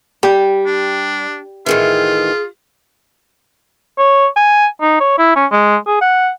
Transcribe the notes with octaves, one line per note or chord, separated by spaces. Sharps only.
G3 G4
D4
A2 D#3 E3 F4 G#4
C#5
G#5
D#4
C#5
E4
C#4
G#3
G#4
F#5